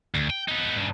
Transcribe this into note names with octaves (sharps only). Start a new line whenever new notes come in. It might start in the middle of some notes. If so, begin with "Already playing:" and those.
D2
G5
B3 D#4
G2 C#3